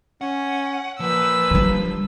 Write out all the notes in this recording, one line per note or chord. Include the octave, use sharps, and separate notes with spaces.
C#4 F#5
A#2 F3 B4 E6
D3 G3